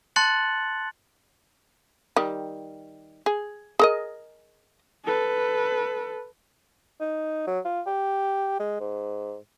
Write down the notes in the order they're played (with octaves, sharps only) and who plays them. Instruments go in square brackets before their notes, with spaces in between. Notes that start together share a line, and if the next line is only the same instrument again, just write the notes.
[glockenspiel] A5 C6 F#6 A6 C#7 F#7
[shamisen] D#3 G3
G#4
G#4 A#4 D#5
[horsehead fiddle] A4 B4
[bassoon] D#4
F#3
F4
G4
G#3
G#2